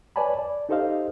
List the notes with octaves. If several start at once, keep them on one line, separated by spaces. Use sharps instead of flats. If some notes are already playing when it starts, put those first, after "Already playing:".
B4 C#5 D5 G#5 A5 B5
D5
D#4 G4 A4 C5 D#5 F5